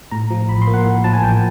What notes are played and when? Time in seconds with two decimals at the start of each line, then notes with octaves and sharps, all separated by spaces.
0.11 A2 A#5
0.30 F3
0.49 A1 B5
0.62 C6
0.67 A#3
0.74 F#5
0.86 A2
1.04 F3 A5
1.13 G#5
1.23 A1 G5